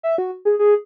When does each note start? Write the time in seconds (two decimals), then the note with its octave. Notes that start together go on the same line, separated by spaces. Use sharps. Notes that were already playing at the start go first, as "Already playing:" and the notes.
0.03 E5
0.18 F#4
0.45 G#4
0.59 G#4